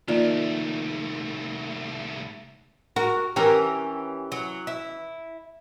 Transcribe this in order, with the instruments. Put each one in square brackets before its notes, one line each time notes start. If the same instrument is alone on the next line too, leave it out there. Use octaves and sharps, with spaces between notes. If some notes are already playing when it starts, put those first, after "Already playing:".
[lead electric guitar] C2 A3 [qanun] D#3 [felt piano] A#3 [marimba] F4 D5
[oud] F#4 [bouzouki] A#4
[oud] E3 C#4 A#4 [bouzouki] G4
[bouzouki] F#3
E4